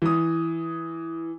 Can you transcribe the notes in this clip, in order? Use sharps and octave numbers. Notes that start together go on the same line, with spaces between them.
E3 D#6